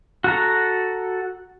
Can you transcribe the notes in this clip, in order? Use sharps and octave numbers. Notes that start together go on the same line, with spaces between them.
F#4 A4 A#5